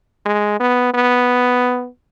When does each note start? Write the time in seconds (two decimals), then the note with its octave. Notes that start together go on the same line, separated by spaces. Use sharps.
0.26 G#3
0.60 B3
0.94 B3